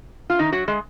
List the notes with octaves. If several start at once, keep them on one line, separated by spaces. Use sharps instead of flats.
F4
D#3 D#4
F#3 F#4
G#3 G#4